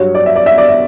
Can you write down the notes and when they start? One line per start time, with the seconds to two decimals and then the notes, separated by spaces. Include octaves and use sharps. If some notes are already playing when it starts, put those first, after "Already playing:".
Already playing: G2 F#3 C#5
0.15 D5
0.26 E5
0.36 D5
0.46 E5
0.58 D5
0.68 E5